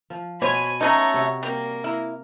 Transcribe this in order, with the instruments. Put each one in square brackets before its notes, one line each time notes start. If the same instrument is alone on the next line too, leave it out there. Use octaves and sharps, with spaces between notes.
[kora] F3
[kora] B2 B3 F#4 [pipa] C5 C#5 [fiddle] G#5 B5
[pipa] F#3 A3 D#4 [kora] C#4 B4 D#5 [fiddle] C#5 A#5
[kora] C3 F#4
[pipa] G3 [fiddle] A#3
[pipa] E4 [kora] A#4